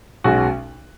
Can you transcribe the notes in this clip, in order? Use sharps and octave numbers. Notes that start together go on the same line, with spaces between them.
B1 B2 G#3 C#4 F#4